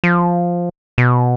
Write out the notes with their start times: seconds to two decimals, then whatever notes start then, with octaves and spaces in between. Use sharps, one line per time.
0.04 F3
0.98 B2